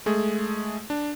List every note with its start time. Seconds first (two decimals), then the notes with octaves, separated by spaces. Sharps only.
0.06 G#3 A3 G#4
0.90 D4